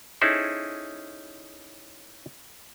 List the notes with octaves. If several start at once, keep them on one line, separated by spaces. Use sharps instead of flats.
C#4 D#4 E4 G#4 A4 C5